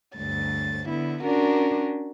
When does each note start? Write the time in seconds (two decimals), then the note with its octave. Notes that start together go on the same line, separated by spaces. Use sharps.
0.16 D2 G2 A6
0.86 D3 B3 E4
1.22 C#4 D4 F#4 A#4